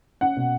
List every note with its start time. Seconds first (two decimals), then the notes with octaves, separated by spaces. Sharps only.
0.21 C#4 F#5
0.37 B2